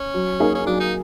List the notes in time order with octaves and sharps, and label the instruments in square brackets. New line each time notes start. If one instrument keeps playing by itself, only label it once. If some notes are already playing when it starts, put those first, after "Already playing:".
Already playing: [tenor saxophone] C#4
[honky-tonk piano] F#3
A#3 D#4 G#4
[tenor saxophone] C#4
[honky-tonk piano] F#3 [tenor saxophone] D4
[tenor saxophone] D#4